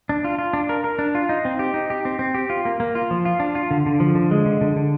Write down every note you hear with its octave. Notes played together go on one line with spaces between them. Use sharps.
D4
F4
F4
D4
A#4
A#4
D4
F4
D#4
C4
G4
D#4
G4
C4
C4
G4
F4
A#3
A#3
F4
F3
F4
D4
F4
D3
D3
F3
D3
G#3
D3
D3
D3